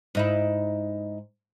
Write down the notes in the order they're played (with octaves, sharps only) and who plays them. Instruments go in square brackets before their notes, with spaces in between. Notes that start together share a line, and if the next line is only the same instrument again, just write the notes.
[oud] G#2 D#4 E4